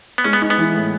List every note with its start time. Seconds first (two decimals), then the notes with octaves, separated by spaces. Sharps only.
0.18 B3
0.24 G#3 C#4
0.33 B3
0.42 D#4
0.50 B3
0.58 E3
0.75 A2